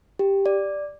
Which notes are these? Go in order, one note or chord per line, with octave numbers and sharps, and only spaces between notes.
G4
D5